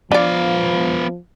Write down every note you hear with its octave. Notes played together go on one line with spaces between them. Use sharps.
F3 B3 D4 D5 F5